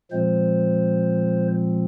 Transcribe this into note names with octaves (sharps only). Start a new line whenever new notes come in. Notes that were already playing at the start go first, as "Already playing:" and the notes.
A#2 F3 G#3 C4 C5